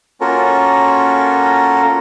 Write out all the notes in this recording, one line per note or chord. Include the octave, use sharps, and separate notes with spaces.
A#3 C#4 F4 F#4 A4 A#4